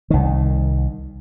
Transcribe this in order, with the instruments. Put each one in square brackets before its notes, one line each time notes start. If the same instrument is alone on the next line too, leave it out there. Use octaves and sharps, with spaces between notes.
[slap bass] C2 D#3